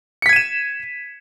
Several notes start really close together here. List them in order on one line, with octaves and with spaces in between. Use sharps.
C#7 B6 G#6 D#7 E7